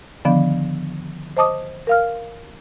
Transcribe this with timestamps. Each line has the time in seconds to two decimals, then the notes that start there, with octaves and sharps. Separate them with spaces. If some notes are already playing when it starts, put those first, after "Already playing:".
0.25 D3 D#3 F3 B3 D4
1.37 C5 D#5 A5 D6 D#6
1.87 A#4 F5 F6